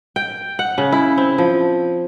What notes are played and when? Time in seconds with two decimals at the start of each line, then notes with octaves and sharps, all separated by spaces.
0.16 G5
0.59 F#5
0.78 C#3
0.92 E4
1.17 C4
1.38 F3